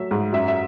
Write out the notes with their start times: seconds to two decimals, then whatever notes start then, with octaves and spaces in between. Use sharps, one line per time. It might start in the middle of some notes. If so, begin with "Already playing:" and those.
Already playing: F#3 A3 E5
0.11 G#2
0.33 F#2 E5
0.48 E5